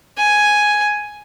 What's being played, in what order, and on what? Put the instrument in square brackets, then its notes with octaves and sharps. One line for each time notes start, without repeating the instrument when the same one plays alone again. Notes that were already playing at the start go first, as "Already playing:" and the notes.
[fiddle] G#5